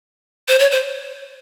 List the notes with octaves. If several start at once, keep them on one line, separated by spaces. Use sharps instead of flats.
C5
C#5
C5